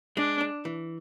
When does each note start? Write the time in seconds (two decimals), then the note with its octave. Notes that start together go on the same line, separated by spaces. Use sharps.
0.17 G#3 D4
0.41 D4
0.65 E3